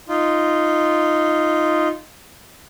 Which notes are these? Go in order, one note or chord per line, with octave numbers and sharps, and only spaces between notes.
D#4 F4